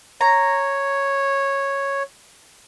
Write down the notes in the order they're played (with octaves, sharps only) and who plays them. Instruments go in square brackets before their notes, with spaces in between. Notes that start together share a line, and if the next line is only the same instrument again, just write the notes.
[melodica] C#5 [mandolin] A#5